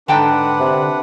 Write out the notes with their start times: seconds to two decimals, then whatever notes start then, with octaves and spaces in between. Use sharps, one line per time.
0.08 G#2 D3 D4 B4 F#5 G5 A5
0.60 C3